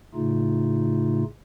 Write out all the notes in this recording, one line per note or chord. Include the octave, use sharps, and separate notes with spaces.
A2 C#3 A3 D#4 F4